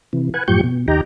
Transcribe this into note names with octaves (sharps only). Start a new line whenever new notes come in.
C3 E3
B4 F#5 G#5
F#2 A2 F3 G4 C#6 G6
B2
D#2 D#4 G4 G5 A#5